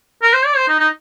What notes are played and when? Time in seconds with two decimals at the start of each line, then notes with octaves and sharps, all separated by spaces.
0.22 A#4
0.33 C5
0.45 D5
0.57 C5
0.68 D#4
0.79 D#4